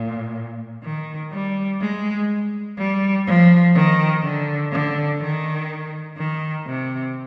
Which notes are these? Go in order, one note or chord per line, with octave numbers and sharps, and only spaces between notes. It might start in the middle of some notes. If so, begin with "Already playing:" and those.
Already playing: A#2
D#3
G3
G#3
G3
F3
D#3
D3
D3
D#3
D#3
C3